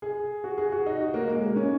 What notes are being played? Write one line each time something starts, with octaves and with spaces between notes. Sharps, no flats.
G#4
F#4
G#4
F#4
D#4
F#4
A#3
G#3
A#3
C#4